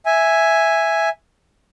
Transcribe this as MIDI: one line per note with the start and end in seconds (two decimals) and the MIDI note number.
0.06 1.09 76
0.06 1.09 80